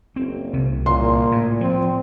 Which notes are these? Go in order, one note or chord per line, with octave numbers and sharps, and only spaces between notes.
F#1 C4
C2 C3
A#2 C6
A2
F3 C4